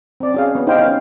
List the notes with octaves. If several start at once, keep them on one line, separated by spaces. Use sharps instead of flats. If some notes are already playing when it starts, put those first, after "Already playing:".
C4 D5
C#4 G#4 F5
B3
D#4 G4 C5 D#5 F5 G5
B3 C#4 F5